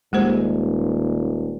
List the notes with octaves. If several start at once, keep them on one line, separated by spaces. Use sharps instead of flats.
D#1 G#3 A#3 G4 C5